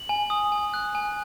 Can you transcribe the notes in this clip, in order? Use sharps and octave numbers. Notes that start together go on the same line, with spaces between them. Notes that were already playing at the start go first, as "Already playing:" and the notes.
Already playing: F#7
G#5
D#6
G#5
F#6
G#5